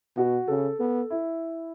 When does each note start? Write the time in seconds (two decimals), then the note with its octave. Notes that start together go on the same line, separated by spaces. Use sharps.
0.17 B2 F#4
0.48 C#3 A4
0.79 B3 A4
1.10 E4